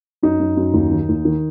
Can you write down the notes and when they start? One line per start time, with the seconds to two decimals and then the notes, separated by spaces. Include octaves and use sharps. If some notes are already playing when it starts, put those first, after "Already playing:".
0.23 F#2 D#4
0.40 F#2
0.57 F#2
0.74 D#2
0.91 D#3
1.09 D#2
1.25 D#3